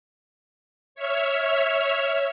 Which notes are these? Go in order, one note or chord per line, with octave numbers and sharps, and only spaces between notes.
C#5 E5 F6